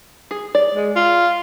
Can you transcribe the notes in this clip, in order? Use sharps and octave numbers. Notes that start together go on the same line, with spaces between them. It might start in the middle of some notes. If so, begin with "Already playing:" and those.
G#4
D5
G#3
F4